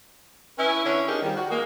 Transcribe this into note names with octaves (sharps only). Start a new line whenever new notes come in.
C#4 E4 B4
D3 C#4 E4
C4 D4 D#4 G4 G#4 A#4
D#3 F3 G3
F#4
G#3 A#3